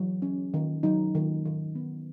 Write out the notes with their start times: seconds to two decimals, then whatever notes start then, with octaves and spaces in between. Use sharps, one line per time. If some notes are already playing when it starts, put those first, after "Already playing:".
Already playing: E3 F#3
0.22 C#4
0.54 D#3
0.83 F#3 D#4
1.15 D#3
1.45 D#3
1.75 B3